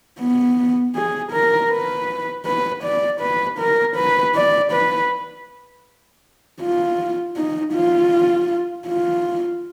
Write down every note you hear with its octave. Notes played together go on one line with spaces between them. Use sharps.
B3
G#4
A#4
B4
B4
D5
B4
A#4
B4
D5
B4
F4
D#4
F4
F4